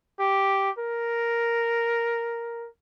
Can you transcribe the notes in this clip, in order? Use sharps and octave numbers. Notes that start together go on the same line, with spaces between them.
G4
A#4